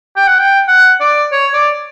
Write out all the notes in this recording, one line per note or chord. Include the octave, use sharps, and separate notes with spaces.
G5
F#5
G5
F#5
D5
C#5
D5